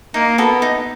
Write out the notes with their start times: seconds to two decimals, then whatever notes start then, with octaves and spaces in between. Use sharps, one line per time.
0.14 A#3 D#4
0.38 B3 F#4 A4
0.62 D#4